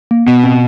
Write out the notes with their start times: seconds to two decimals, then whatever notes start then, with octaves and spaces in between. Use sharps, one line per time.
0.11 A#3
0.26 B2 B3
0.44 C4